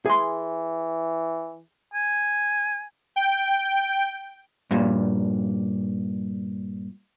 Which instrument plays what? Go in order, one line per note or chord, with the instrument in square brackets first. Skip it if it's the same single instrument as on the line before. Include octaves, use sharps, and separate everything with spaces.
[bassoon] E3 [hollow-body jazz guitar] G#4 C6
[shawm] G#5
[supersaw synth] G5
[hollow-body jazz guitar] G2 A#2